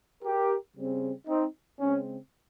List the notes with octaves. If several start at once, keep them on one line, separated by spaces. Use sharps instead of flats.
G4 A#4
C#3 G3 C4
C4 D#4
C#3 G#3 C4 C#4